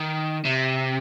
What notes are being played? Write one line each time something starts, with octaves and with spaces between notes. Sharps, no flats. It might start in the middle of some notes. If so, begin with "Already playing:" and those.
Already playing: D#3
C3